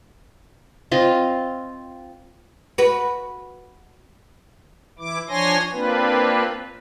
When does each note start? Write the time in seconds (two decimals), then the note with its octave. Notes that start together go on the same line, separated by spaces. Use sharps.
0.91 C4 F4 D#5
2.78 F#4 B4
4.99 E3 E4 D6
5.29 F3 D4 C#5 G#5 C6 A#6
5.71 A#3 C4 D4 F4 B4